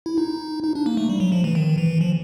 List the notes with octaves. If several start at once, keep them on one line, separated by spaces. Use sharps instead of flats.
E4
D#4
D#4
D4
A#3
A3
G3
F#3
F3
E3
D#3
E3
F3